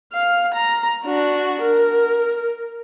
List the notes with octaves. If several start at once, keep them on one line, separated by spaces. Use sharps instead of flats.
F5
A#5
D4 F#4
A#4